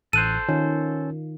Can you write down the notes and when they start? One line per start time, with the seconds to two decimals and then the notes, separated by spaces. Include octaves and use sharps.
0.13 A1 A4 C5 F#6 D#7
0.48 D#3 C#4 F4